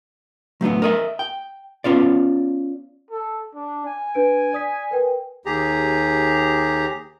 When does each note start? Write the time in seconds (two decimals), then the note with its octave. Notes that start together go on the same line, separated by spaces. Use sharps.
0.61 F#3 A3 B3 D4
0.82 A#4 D#5 E5
1.19 G5
1.84 B3 C#4 F4 D5
3.11 A4
3.55 D4
3.85 G#5
4.14 D4 B4 D7
4.53 D5 D#6 B6
4.91 A#4 B4 G5
5.46 D#2 G4 G#4 A#5